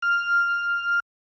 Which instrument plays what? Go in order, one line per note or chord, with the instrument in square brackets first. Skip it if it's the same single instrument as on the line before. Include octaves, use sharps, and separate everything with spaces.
[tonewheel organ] F6